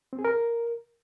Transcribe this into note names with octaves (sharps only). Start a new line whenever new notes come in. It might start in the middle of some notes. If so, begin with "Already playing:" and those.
C4
G#4
A#4